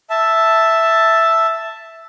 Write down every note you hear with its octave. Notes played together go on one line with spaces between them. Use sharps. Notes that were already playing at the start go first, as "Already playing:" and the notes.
E5 A5